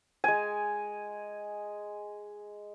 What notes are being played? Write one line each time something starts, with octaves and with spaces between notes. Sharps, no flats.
G#3 G#5